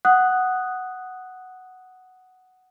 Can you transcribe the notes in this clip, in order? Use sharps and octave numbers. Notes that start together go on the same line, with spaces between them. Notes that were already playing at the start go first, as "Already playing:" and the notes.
F#5 D#6 F#6